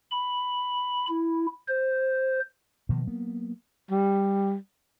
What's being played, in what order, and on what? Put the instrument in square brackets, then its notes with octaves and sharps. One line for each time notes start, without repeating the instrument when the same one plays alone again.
[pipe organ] B5
E4
C5
[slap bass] B2 D#3 F3 A#3
F#3 A#3 B3
[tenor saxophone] G3